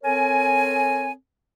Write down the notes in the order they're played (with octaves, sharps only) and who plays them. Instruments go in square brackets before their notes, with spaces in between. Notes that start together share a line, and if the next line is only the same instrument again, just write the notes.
[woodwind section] C4 A4 A#4 C#5 G#5